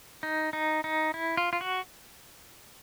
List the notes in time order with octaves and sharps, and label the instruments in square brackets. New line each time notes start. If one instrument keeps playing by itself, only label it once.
[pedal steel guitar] D#4
D#4
D#4
E4
F4
F4
F#4